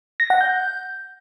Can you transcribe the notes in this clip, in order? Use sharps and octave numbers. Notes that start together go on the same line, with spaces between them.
A#6
F#5
G6